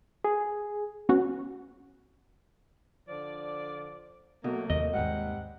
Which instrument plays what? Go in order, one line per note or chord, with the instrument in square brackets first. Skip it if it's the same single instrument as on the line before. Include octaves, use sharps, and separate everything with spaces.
[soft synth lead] G#4
[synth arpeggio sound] B3 C#4 F#4
[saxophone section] D3 F3 D5
[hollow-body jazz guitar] B2 [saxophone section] F#3 A3 A#3
[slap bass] D#2 C3 [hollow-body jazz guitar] D#5
[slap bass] D#2 G#2 G#3 [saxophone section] C3 G3 F#5